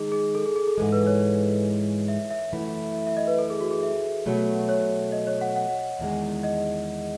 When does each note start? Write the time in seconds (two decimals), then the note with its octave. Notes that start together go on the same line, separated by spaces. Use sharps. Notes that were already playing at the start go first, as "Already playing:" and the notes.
Already playing: D#3 G#3 D#4 G#4
0.12 G#4
0.35 A4
0.46 G#4
0.56 G#4
0.67 A4
0.78 G#2 E3 G#3 A4
0.92 B4
1.07 C#5
2.08 E5
2.31 E5
2.52 F#2 E3 A3 E4
3.07 E5
3.17 D#5
3.27 B4
3.39 A4
3.50 G#4
3.61 F#4
3.71 G#4
3.83 E5
4.26 B2 F#3 A3
4.69 C#5
5.12 D#5
5.27 C#5
5.41 F#5
5.56 F#5
5.99 E2 D#3 G#3
6.43 D#5